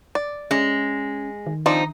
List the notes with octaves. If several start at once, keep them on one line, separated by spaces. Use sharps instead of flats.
D5
G#3 C#4
D#3
F3 C4 D#4 D5